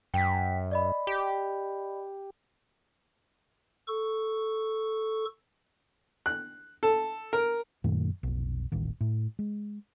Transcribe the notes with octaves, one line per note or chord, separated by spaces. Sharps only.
F#2 G5 B6
D5 D#5 B5
G4
A4 C#6
F#6
A4
A#4
F#2 A#2 D#3 A3
F1 B1
D#1 A1 D#2 D#3
A2
G#3